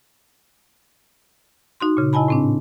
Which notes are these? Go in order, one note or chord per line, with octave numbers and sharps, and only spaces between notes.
D#4 F#4 C6
A#2 C#3
E4 D#5 G#5 A5 B5
A2 C4 D4